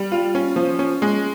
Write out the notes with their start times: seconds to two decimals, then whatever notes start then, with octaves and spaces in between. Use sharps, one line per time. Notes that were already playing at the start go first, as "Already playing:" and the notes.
Already playing: G3
0.12 F4
0.35 C#4
0.56 F3
0.79 C#4
1.02 G#3